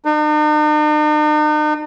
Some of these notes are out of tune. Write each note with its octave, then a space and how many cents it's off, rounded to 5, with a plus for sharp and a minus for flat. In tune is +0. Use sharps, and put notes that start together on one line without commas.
D#4 -45